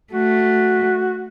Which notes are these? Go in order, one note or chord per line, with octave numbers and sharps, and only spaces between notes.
A3 F#4